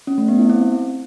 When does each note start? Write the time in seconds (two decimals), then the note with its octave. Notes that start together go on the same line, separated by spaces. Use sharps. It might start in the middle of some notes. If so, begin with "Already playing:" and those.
0.07 C#4
0.18 A3
0.28 B3
0.39 E4
0.49 C4